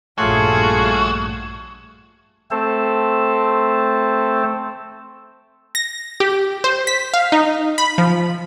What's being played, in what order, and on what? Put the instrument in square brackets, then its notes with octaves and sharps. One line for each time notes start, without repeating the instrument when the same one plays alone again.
[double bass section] A#1 G2 [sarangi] A3 [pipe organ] F4 G#4 C#5 [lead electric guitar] F#4
[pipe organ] A3 C4 A4 C5 A5
[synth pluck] A#6
G4
C5
B6
F5
D#4
B5
F3